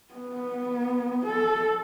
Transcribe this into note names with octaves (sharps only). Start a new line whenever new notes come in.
B3
A4